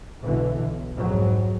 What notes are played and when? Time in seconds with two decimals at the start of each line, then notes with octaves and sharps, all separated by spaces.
0.23 B1 B2 D3 E3
0.59 B1
0.98 F2 G#2 F#3